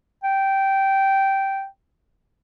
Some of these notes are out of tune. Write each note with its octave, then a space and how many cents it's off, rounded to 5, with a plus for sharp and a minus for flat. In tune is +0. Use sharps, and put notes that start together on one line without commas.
G5 -10